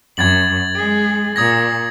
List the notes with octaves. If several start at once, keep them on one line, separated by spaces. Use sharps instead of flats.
F#2 G#6 A6 F#7
G#3 G#4
A#2 D#6 G#6 A#6